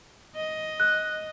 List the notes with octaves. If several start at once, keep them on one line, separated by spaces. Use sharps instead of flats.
D#5
F#6